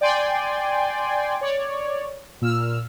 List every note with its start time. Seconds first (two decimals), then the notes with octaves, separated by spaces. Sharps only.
0.01 D5 G5 G#5 C6
1.41 C#5 D5
2.41 A#2 E6 F6